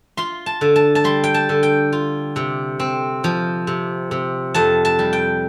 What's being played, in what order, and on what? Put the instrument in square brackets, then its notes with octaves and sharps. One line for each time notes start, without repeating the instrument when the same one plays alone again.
[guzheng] F4 C6
A5
D3
A5
A5
G3 C6
G5
A5
D3
G5
F4
C3
C4
F3
C3
C3
F2 A5
A5
G3
G5